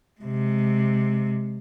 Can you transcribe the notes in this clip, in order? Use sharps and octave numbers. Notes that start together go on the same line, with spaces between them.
C3 G#3